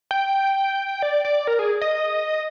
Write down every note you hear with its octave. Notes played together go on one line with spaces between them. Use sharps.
G5
D5
D5
A#4
G#4
D#5